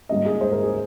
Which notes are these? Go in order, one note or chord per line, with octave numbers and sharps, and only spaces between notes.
G#2 G3 A#3 C#4 D#5
G#4
C5
A#4
G#4